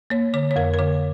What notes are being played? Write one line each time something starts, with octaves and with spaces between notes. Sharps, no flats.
A#3 C#5
D3 C#5
C#5
F2 A#4
A#4
D3 C#5